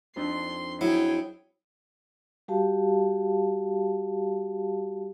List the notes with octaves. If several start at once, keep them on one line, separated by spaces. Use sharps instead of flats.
F2 D4 D#4 C6
F#3 E4 G#4 G5
G3 F#4 G4 F5 A5